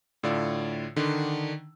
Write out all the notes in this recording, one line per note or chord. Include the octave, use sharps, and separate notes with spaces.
A2 D3 F4 D5 E6
D3 D#3 D4